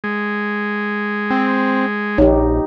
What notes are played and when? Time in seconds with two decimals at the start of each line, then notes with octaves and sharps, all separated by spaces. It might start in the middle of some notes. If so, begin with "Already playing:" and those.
0.04 G#3
1.30 C4
2.18 A#1 D#4 G4 C#5